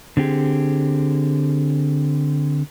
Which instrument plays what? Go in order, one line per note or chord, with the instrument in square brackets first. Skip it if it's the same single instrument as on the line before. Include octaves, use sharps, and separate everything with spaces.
[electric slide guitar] D3 C4 G4 G#4